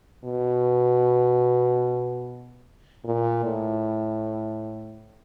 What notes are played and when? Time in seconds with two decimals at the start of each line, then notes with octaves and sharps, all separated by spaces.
0.24 B2
3.05 A#2
3.44 A2